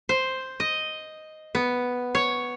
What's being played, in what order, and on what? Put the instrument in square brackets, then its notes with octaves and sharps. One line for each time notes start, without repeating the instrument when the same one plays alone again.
[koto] C5
D#5
B3
C#5